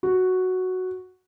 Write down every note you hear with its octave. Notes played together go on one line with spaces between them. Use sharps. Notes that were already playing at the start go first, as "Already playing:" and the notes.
F#4